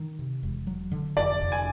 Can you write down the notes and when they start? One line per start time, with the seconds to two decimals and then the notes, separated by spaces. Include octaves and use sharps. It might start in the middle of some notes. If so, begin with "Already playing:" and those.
Already playing: D#3
0.19 C3
0.43 E1
0.67 F#3
0.92 D3
1.16 F1 D5
1.41 F1
1.52 G#5